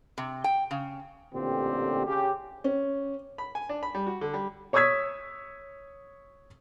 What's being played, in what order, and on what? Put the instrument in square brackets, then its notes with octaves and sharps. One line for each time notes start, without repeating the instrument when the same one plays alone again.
[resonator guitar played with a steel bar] C3
G5
C#3
[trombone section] A1 A#2 D3 C4 G4
C#3 C#4 G4
[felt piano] C#4
[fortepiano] B5
G#5
D4
B5
G3
F#4
D3
G3
[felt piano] C#5 C#6 D#6 E6 G#6 B6